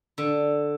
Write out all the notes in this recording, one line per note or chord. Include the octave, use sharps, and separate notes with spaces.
D3